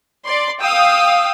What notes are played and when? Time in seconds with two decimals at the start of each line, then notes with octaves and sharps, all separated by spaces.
0.25 D5 C6
0.60 F5 G5 D#6 E6